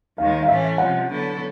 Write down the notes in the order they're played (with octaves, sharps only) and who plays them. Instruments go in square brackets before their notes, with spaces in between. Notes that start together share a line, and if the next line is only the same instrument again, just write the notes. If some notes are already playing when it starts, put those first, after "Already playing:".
[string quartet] D#2 D#3 G#3 [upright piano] F5
[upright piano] F5
[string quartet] A2 E3 A3 C#4 [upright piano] E5
[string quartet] C3 F3 G#3 [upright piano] F#5
[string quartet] D3 F#3 B3 E4 A4